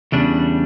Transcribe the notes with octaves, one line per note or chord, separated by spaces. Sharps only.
E2 C#3 G3 D4